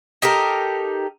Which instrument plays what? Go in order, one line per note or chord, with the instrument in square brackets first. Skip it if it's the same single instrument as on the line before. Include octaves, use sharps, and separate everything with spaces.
[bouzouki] D#4 G4 A4 A#4